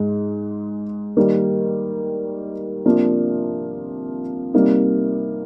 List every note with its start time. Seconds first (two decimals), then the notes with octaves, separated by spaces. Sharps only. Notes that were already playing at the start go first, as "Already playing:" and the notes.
Already playing: G#2 G#3
1.17 D#3 G3 A#3
2.85 C3 F3 A#3 D4
4.54 C3 G3 A#3 D#4